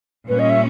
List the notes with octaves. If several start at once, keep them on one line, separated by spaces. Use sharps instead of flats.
A#2 G3 C#4 B4
D#5
E5